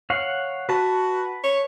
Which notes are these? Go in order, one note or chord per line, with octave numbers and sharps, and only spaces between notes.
C#5 F5 F#5
F#4 B4 A5
C#5